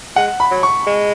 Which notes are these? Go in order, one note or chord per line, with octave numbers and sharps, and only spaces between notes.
G#3 F#5
B5
F#3
C#6
G#3